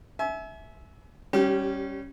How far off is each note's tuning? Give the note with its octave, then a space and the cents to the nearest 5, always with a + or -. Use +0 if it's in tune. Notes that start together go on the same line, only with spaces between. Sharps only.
E5 -10 G#5 +35
G3 +0 C#4 -5 G4 -30